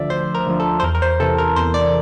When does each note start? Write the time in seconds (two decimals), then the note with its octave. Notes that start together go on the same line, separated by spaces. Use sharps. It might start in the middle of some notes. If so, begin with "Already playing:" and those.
Already playing: D2 D3 F3 D5 E5
0.10 D2 C5
0.35 A#4
0.47 D3 F3
0.60 A4
0.80 C5
0.83 E2 A#4
0.95 A#4
1.02 C5
1.20 C3 E3 A4
1.38 A#4
1.56 E2 C5
1.74 D5